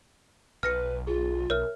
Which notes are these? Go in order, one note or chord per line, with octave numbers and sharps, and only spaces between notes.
B1 B4 F6 A#6 C#7
F4 G#4
B1 A#4 C#5 E5 F6